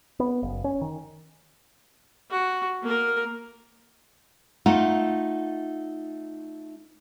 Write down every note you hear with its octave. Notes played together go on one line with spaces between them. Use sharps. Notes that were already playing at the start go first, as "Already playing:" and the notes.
B3
F#1
C#4
D#3
F#4
A#3 A#4
A3 D#4 F4 F#5